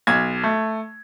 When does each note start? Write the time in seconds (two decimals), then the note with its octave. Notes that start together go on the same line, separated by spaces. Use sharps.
0.07 B1 G#6
0.43 A3